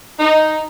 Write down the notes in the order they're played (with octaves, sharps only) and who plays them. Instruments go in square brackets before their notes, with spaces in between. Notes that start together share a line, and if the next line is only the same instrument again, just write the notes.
[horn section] D#4